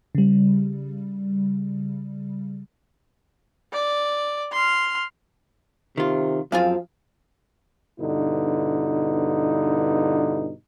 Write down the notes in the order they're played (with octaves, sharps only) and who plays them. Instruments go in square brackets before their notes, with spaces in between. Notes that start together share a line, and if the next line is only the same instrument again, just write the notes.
[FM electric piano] C#3 G3
[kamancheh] D5
C6 F6
[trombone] C3 [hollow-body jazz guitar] D#3 F4
[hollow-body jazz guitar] F#2 C4 [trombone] F3 [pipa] F4 G#4 F5
[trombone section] G2 B2 D3 D#4 E4